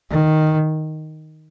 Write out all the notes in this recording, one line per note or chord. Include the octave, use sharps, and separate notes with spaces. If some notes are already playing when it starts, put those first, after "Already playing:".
D#3